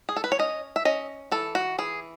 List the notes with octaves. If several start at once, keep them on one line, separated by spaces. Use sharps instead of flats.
G#4
A4
B4
C#5
C#4 D#5
E5
C#4 D#5
E3 A4
F#4
E3 G#4